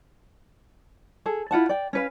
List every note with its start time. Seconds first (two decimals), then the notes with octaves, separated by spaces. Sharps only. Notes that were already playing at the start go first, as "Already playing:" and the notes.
1.26 G#4 A4
1.51 E4 F4 F#5 A5
1.69 D5 G5
1.93 C#4 B4 F5